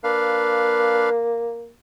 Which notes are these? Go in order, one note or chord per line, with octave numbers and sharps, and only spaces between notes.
A#3 D4 B4 F5